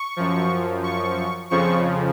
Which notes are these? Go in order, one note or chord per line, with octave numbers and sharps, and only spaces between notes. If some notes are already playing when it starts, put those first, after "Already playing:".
Already playing: C#6
F#2 F3
C#6
F2 C#3 F3 C#6